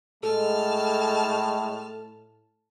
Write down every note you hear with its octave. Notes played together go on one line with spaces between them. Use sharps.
A2 G#3 A4 A5 F6